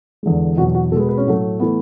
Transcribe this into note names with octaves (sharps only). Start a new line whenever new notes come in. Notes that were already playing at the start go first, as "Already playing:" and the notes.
E2 D3 G#3
E2 B2 F#3 F#4
F#4
B2 G#3 A4 B4
B4
C#4
A2 F#3 A3
E3 A3 B3